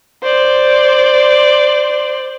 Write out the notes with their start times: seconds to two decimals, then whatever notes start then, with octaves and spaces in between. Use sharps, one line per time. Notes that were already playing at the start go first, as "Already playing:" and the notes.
0.23 C5 D5